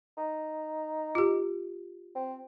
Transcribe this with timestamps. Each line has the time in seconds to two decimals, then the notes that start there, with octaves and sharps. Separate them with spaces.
0.18 D#4
1.15 F4 G4
2.15 C4